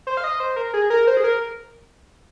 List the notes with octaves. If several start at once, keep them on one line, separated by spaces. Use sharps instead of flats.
C5
F5
D#5
C5
A#4
G#4
A#4
C5
G#4
A#4